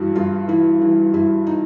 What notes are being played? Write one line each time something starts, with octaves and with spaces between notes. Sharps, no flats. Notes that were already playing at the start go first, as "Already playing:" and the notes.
Already playing: G2 E3 E4 F#4
G2 F4
E3 E4
E3
G2 E4
D#4